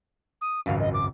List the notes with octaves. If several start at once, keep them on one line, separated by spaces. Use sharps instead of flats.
D#6
G#1 C#2 F#2 F5
D#5
D6